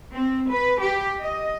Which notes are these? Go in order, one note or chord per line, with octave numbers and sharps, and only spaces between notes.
C4
B4
G4
D#5